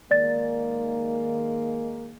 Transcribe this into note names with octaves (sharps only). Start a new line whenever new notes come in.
D#3 G#3 A#3 D5 A6